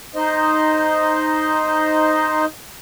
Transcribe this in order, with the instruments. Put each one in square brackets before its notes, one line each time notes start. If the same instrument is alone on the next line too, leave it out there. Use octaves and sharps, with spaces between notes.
[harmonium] D#4 C5 D#5